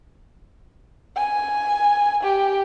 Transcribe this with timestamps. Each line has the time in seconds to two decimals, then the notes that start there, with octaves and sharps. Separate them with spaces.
1.17 G#5
2.23 G4